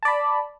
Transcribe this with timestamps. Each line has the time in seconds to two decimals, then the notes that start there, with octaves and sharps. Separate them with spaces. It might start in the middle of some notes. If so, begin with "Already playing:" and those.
0.03 A5
0.05 D5
0.08 B5